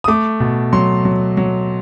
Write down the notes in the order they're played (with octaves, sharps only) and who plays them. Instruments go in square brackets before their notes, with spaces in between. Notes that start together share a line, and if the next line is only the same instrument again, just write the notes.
[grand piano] D#6
A3 D6
B2
F#3 C6
F#3
F#3